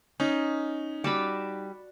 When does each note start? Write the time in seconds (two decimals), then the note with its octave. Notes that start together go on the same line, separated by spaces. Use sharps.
0.20 C#4 D#4
1.04 G3 F#4 A5 B5